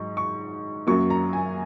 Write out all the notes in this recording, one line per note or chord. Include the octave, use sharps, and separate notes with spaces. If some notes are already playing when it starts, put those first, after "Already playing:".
Already playing: G#2 F#3 C#6
C#6
F#2 F#3 A#3 C#6
A#5
G#5